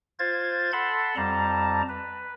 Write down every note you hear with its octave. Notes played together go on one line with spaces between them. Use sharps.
F4 C5 G#6 A6
A4 F#5 A5 B5 C6
F2 G3 A5 A#5
B4